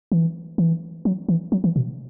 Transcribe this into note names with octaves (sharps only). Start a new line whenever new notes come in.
E3
E3
F#3
E3
F#3
E3
B2